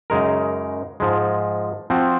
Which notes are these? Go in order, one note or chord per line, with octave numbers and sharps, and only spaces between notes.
F#2 C#3 G#3 D#4 A#4
G#2 F3 G#3
F3 C4 F#4